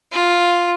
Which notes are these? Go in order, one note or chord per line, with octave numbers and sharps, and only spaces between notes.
F4